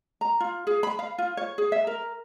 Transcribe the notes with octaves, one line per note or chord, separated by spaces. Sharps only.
A#5
F4
G#4
B5
F5
F4
C#5
G#4
E5
A#4